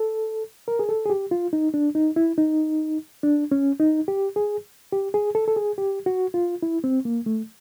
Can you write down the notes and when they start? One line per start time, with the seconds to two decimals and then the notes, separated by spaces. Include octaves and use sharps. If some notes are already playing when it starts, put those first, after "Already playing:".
Already playing: A4
0.68 A#4
0.79 G#4
0.89 A4
1.06 G#4
1.10 G4
1.31 F4
1.53 D#4
1.74 D4
1.95 D#4
2.16 E4
2.38 D#4
3.23 D4
3.51 C#4
3.80 D#4
4.08 G4
4.36 G#4
4.92 G4
5.14 G#4
5.35 A4
5.48 A4
5.56 G#4
5.78 G4
6.06 F#4
6.34 F4
6.63 E4
6.84 C4
7.05 A#3
7.26 A3